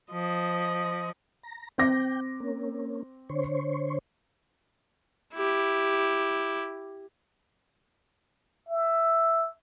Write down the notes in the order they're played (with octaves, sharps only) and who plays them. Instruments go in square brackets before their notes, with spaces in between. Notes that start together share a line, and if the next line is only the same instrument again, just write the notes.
[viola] F3 D#5
[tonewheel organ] A#5
[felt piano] C4 D6 A#6 [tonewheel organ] G5
[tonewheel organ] A#3 C#4
D3 C5 C#5
[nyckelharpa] E4 G4
[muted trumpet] E5